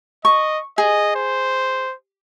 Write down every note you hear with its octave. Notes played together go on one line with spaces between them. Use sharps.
D#5 C#6
G#4 D#5
C5